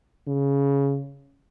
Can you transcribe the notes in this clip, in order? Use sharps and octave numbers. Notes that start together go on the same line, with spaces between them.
C#3